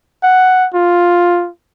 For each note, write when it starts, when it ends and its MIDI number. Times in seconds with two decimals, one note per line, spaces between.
0.23 0.67 78
0.74 1.49 65